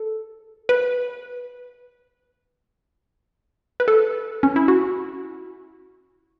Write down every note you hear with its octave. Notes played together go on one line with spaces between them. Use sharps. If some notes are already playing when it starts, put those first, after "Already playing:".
Already playing: A4
B4
B4
A4
C#4
E4
F#4